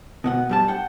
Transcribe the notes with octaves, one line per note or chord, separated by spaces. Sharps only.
B2 B3 F#5
G2 G3 A5
F#5 G5